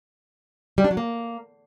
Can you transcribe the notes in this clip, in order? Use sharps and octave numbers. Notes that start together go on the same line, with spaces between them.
G3
D4
F#3
A#3